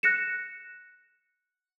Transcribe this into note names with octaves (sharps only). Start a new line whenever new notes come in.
F#6 A#6 C#7 E7